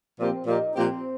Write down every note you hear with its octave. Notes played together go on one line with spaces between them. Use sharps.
A#2 F3 A#3 C4 G4
A#2 F3 A#3 D#4 G4
A#2 F3 A#3 C4 G4